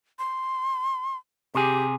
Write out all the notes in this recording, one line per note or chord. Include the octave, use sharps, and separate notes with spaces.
C6
C3 G4 G#4